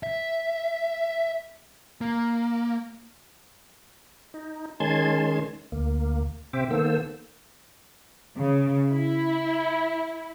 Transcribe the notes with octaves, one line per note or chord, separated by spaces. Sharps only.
E5
A#3
D#4
D#3 G#3 C#4 A5 C6 G#6
D2 A#3
C3 C4 C5 E5 D6
D#3 A#3 B3 A4 C5 E6
C#3
E4